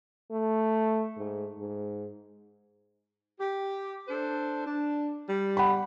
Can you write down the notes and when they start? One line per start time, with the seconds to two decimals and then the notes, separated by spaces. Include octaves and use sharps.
0.31 A3
1.17 G#2
1.59 G#2
3.40 G4
4.08 D4 A4 C5
4.67 D4
5.29 G3
5.57 F#5 B5